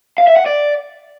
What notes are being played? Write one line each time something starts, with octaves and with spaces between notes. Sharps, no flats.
F5
E5
F#5
D5